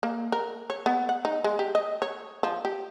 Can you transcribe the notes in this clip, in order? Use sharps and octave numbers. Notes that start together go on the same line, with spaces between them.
A#3
A#4
C#5
B3
F#5
D#4
G#3
G4
D#5
C#5
F3
G4